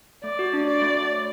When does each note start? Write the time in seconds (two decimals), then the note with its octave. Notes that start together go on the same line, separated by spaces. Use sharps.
0.24 A3 D5
0.39 F#4
0.53 D4
0.67 F#4 D5
0.82 A3
0.97 F#4
1.11 C#5